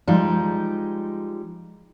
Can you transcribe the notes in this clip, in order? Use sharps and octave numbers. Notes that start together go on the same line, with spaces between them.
F3 G3 G#3 D#4